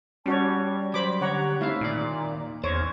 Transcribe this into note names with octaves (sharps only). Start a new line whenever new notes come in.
G3 C#4 F#4 C#5 A5
F#3 C5 D5 B5 D6
D3 G4 C#5 F#5 A#5
A3 C4 D#4 E4 F5
D#2 A#2 D5
E2 C5 C#5